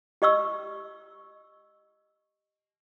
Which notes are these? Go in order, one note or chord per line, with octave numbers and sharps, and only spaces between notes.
G4 D#5 C#6 E6